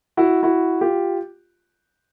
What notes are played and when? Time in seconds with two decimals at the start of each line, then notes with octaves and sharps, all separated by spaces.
0.17 E4 F#4
0.43 E4 F#4
0.81 F4 G4